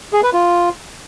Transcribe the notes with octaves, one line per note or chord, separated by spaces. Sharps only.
G#4
B4
F4